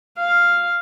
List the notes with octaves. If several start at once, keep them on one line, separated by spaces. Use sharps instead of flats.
F5